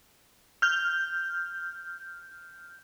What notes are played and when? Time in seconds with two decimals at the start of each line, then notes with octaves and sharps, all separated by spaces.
0.62 F6 G6